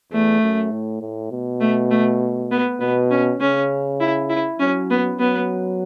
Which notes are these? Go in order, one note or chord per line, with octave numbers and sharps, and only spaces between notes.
E2 A3
F#2
A2
A2
B2
A3
A3
B3
B2 B3
C#4
C#3 C#4
E4
E4
F#3 C#4
B3
F#3 B3